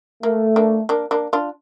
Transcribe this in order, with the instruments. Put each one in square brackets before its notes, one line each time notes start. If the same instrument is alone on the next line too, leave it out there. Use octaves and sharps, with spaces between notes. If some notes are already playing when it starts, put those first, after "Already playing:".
[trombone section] A3 [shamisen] A#3
[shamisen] A#3 D4
A#3 D4
A#3 D4
D4 F4